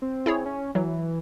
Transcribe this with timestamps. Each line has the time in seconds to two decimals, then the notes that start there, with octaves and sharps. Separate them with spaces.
0.02 C4
0.26 E4 G#4 C#5
0.46 C#4
0.75 E3 F#3